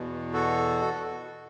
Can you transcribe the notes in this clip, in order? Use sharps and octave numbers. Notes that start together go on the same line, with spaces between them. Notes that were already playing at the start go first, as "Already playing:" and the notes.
Already playing: E2 B2
F#4 A4